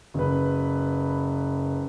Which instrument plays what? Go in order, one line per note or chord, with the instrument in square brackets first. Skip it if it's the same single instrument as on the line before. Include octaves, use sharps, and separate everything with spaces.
[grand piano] F#1 B4